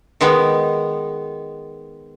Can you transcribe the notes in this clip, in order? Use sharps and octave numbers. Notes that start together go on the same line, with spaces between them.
D#3 G#3 B3